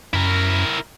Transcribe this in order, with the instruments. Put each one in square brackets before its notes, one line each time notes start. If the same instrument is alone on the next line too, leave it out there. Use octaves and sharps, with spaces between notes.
[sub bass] F#2 [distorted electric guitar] E4 A#4